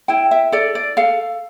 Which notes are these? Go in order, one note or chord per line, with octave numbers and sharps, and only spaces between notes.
E4 G5
E5
A4 D5
D5
A4 F5